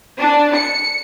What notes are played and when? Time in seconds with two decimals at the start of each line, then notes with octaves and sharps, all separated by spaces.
0.19 D4
0.54 C#7